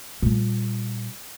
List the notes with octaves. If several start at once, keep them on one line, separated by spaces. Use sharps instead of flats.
A#2 G3